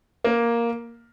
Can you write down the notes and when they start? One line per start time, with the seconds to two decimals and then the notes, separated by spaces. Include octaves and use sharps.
0.24 A#3